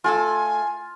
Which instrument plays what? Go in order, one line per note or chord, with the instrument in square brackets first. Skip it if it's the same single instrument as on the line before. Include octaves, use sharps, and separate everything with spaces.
[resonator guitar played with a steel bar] A3 G#4 A4 [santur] F4 [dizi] G#5